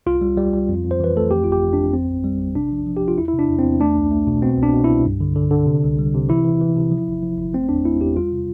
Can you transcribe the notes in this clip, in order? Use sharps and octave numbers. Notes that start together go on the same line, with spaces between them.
C2 F4
G3
G3
G3
F2
F2
C5
E3 B4
A3 A4
F2 G4
G1 F4
G4
F2
F2 D4
A1 C4
A1
G3
A1
C3 D4
F3
F3
G4
F3
F4
E2 E4
E4
C3
D4
E2
C4
E2
A3 D4
C2
A3
B2
B2 C4
C2 D4
B2
C2 E4
G2
D3
D3
D3
C3
C2
G3
C3
E3 E4
E3
E3
C3
F3
G1
F3
G1
A3 C4
E2 D4
A3 E4
E2 G4
G3 F4
C3